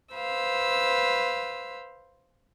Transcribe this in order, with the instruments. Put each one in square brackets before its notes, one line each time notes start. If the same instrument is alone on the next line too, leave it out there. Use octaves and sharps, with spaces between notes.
[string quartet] B4 C5 F5 E6